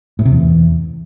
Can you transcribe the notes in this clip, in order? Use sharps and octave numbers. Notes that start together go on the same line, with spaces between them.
A2
C3
E2